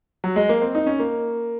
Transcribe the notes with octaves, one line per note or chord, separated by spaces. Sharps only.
F#3
G#3
A#3
C4
D#4
C#4
A#3